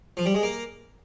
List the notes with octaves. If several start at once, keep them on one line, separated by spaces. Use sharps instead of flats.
F3
G3
G#3
A#3